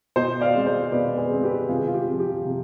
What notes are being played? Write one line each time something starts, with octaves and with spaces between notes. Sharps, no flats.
B2 C5 D#5
D5 F5
G#3 C4
C5 D#5
B2 B4 D5
G#4 C5
G#3 C4
G4 B4
C3 F4 G#4
F4
G4
F3 C4
G4
C3